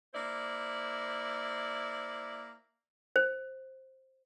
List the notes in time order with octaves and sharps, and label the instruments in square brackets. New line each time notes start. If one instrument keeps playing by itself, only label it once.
[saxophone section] A#3 E4 C5 D5
[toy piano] C5